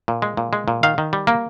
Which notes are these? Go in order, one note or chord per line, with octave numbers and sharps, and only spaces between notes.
A#2
G#3
A#2
G#3
A#2
D#3 F5
D#3
G3
A#3